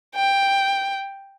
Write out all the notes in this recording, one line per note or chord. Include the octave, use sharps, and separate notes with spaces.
G5